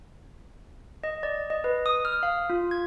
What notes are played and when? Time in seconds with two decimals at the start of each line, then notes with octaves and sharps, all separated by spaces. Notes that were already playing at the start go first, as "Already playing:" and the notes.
1.04 D#5
1.23 D5
1.50 D#5
1.64 B4
1.86 D#6
2.05 F6
2.23 F5
2.50 F4
2.71 G#6